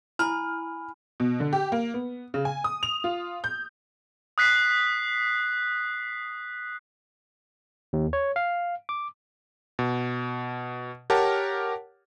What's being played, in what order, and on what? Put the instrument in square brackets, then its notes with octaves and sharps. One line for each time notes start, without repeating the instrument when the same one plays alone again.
[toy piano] E4 [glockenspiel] G#5 B5 [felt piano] F6
[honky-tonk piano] B2
D3
G4
A#3
B3
C#3
G#5
D#6
F7
F4
G6
[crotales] D#6 F#6 B6 C7
[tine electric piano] D#2
C#5
F5
D6
[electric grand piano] B2
G4 A#4 C#5 F#5 A5